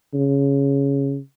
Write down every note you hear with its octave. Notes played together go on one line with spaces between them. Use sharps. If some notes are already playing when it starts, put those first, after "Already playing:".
C#3